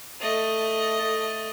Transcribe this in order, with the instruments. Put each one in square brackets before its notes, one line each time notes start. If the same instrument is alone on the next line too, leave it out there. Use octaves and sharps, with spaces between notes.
[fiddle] A3 D#5